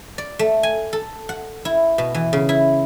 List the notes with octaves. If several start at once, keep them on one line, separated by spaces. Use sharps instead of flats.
D5
A3
G#5
A4
F#5
E4
B2
E3
C#3
E4